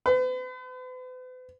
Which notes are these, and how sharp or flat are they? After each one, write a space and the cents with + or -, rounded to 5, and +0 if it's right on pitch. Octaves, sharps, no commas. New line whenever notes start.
B4 +45